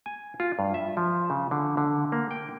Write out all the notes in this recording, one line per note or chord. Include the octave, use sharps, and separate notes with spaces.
G#5
F4
G2
E5
F3
C#3
D3
D3
A#3
G5